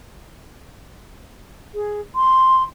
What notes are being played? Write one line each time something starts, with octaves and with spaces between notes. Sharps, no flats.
G#4
C6